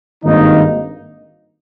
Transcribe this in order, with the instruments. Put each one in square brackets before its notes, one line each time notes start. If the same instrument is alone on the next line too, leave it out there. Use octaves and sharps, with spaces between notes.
[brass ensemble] G#1 G2 D#3 A#3 D#4